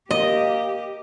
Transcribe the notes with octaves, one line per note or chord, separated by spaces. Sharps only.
A#3 G4 D#5